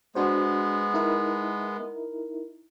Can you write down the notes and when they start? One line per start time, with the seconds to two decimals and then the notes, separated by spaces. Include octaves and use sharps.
0.15 G#3 B3 D4 F#4 C5
0.94 D#4 E4 A#4